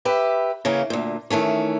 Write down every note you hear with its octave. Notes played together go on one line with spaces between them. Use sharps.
G4 B4 E5
C#3 E3 A#3 C#4
D2 A#2
D#3 E3 A3 C#4